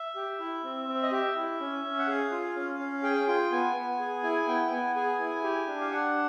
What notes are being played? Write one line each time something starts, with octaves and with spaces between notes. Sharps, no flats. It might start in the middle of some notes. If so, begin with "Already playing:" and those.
Already playing: E5
G4
E4
C4
C4
D#5
G4 E5
E4
C#4
C#4
F#5
G#4 F5
F4
C#4
C#4
G#4 G5
F4 G5
B3 G#5
B3
G#4
E4
B3 G5
B3 G#5
G#4 G#5
E4
G4
D4
F5
D4 F#5